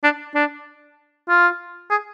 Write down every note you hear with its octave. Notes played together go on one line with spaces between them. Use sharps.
D4
D4
F4
G#4